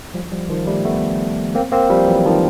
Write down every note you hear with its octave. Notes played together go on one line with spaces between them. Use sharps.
F3 G3
F3 G3
D#3 F3
G3 A3
A3 B3
A#3 C4
A#3 C4
F3 G3
E3 F#3
D#3 F3